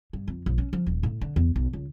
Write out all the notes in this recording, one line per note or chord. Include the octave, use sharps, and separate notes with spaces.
G2
F2
A#1
C#4
F3
D#1
A2
D3
E2
B1
C#2